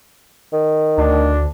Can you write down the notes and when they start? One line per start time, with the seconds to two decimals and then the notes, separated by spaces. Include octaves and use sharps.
0.53 D#3
0.98 D2 D4